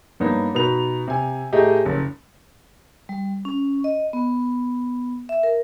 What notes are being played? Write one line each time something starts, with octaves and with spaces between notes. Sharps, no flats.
G2 A#3 B3 D#4 C#5
B2 D#4 B4 F7
C3 G#5
A2 A3 G4 G#4 D#5 A#5
F#1
G3
C#4
D#5
B3
E5
A#4